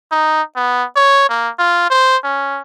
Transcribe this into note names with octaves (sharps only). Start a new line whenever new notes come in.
D#4
B3
C#5
A#3
F4
C5
C#4